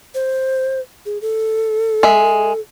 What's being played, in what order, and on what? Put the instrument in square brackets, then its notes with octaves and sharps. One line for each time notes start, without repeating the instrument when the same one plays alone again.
[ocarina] C5
G#4
A4
[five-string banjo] G#3 E5